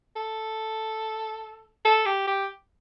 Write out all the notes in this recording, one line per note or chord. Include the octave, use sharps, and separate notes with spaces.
A4
A4
G4
G4